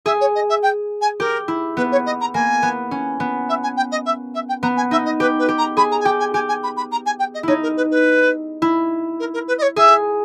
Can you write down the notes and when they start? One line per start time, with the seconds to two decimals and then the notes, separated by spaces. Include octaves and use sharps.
0.05 G#4 E5
0.20 C#5
0.35 D#5
0.49 E5
0.62 G5
1.01 G#5
1.19 G4 A#4
1.48 E4
1.77 B3 B4
1.91 C#5
2.06 D#5
2.20 A#5
2.34 A#3 G#5
2.62 B3
2.91 C#4
3.20 B3
3.48 E5
3.63 G#5
3.76 G5
3.91 D#5
4.05 E5
4.34 E5
4.48 G5
4.62 B3 A#5
4.76 G#5
4.91 D#4 E5
5.05 D#5
5.20 G4 B4
5.39 B4
5.48 G4
5.58 A#5
5.77 G#4 B5
5.91 A#5
6.00 G#5
6.05 G4 G5
6.19 G#5
6.34 G4 G#5
6.48 G#5
6.63 B5
6.76 B5
6.91 A#5
7.06 G#5
7.19 G5
7.34 D#5
7.43 D#4 E4 C#5
7.62 A#4
7.76 B4
7.91 B4
8.62 E4
9.19 A#4
9.33 A#4
9.48 B4
9.58 D#5
9.62 C#5
9.76 G#4 E5